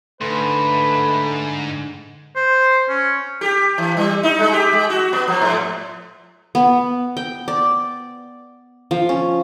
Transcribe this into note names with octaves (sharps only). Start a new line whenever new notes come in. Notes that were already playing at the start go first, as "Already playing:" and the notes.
G#2 D3 A3 B4 C6
C5
C#4
G4
E3
G3
D#4
G#3
G4
G#3
F#4
B3
F3
G#2
B3
G5
D5
F3
C#4